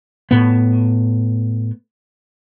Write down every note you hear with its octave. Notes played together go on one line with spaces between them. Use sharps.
A2 B3